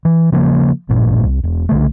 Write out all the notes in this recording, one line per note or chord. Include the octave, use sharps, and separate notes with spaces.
E3
C#3 F3 A3 A#3
A1 G2 A#2
C2
E1
C2 D3 A3